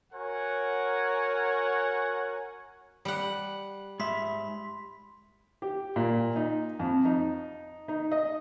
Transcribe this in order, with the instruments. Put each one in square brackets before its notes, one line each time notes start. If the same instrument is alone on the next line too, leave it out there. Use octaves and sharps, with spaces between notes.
[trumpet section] F#4 A#4 C#5 F#5 G#5
[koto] G3 F#5
[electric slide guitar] G#2 E5 [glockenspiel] B5 C6 B6
[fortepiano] G4
A#2
D#4
F2
D#4
D#4
D#5